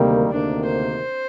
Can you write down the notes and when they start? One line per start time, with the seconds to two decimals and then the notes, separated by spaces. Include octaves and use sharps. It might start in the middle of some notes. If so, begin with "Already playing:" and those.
Already playing: D2 C3 D#3 G3 A#3 C4
0.30 D2 C3 D#3 A#3 D4
0.66 C5